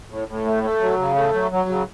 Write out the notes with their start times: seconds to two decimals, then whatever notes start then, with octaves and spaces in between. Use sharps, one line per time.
0.10 A2
0.28 A2
0.46 A3
0.63 A3
0.81 F#3
0.99 C#3
1.16 A3
1.34 F#3
1.51 F#3
1.69 C#3